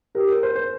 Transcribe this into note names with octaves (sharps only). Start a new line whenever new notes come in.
G4 A#4
A#4
C5
C5